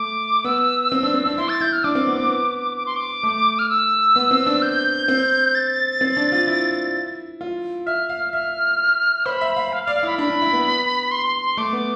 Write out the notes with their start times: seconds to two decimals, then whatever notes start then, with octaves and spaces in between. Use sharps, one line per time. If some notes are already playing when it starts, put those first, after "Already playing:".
Already playing: A3 D6
0.44 B3 E6
0.92 C4
1.03 D4
1.14 C4
1.26 D4
1.38 E4 C6
1.49 A6
1.61 E4 G6
1.72 F6
1.84 D4 D6
1.95 C4
2.07 B3
2.18 B3
2.76 D6
2.86 C6
2.96 D6
3.23 A3
3.59 F6
3.69 E6
4.16 B3
4.31 C4
4.46 D4
4.62 G6
5.08 C4
5.55 A6
6.01 C4
6.17 D4
6.32 F4
6.47 E4
7.41 F4
7.86 E5 F6
8.09 F5
8.33 E5 F6
9.26 C5 B5
9.41 E5
9.56 F5
9.72 F5
9.84 F5
9.87 D5
9.95 F5
10.03 E4 B5
10.18 D4 B5
10.30 D4
10.42 E4
10.53 B3
11.11 C6
11.26 C6
11.42 C6
11.57 A3 D6
11.73 B3